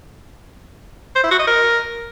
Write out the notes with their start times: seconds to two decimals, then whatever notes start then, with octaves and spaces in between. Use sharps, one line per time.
1.16 C5
1.24 E4
1.31 F#4
1.39 D#5
1.47 A#4